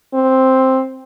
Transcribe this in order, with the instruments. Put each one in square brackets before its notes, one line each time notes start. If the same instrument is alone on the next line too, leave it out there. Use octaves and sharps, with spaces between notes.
[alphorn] C4